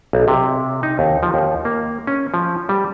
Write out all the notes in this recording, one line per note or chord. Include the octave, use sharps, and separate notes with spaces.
B1
C3
D#4
D#2
F3
D#2
A#3
C#4
F3
G3